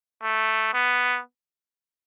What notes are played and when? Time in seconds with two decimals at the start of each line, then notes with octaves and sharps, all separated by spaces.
0.23 A3
0.73 B3